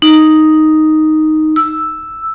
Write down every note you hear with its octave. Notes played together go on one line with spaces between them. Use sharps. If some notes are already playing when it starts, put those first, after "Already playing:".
D#4
E6